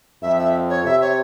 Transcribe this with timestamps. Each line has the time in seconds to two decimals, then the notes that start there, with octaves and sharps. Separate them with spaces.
0.22 F2 E5
0.38 E5
0.69 C#5
0.85 C3 E5
1.01 C#5